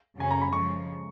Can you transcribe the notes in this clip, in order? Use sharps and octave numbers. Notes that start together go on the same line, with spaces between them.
F#2 C#3 F#3 C#4 G#5
A#5
B5
C#3 F3 G#3 C#6